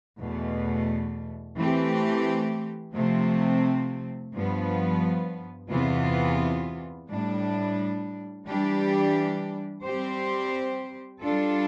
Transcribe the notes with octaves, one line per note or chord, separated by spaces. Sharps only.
E2 B2 A3
E3 A3 C4 G4
C3 F3 A3 C4
G2 F3 B3
E2 C3 E3 B3 F4
A2 G3 D4
E3 G3 D4 G4
G3 C4 G4 C5
G3 D4 F4 A4